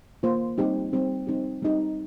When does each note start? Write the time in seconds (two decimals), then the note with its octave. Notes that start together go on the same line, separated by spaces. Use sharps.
0.23 A#3 F4 C5
0.58 G3 C4 D#4 G4
0.93 G3 C4 D#4 G4
1.27 G3 C4 D#4 G4
1.62 G3 C4 D#4 G4